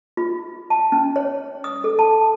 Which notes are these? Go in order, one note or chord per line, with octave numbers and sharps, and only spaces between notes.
F4
A5
C#4
C#5
D#6
A4
A5